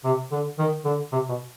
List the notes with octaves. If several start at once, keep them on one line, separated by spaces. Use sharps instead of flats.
C3
D3
D#3
D3
C3
B2